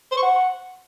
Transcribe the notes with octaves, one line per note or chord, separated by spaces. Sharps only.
C5
C#6
F#5